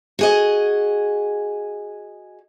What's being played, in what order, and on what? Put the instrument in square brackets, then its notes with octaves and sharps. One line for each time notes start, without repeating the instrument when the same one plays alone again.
[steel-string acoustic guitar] F#4 G#4 D#5